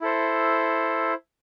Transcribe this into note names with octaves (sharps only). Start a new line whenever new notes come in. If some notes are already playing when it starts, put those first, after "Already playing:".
E4 A4 C5